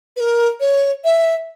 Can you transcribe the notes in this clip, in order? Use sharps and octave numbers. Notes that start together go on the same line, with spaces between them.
B4
A#4
C#5
E5